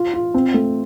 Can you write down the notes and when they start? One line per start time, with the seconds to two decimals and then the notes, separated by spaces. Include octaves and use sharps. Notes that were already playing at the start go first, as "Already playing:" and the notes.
Already playing: F4
0.14 F4
0.34 C4
0.54 A3